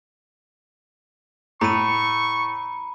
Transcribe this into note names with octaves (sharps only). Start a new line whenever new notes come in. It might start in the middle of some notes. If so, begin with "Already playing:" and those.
A2 A#5 B5 C#6 D#7